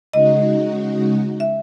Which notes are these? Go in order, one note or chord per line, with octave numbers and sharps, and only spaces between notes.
C#3 G#3 D#4 F#4 D#5
E5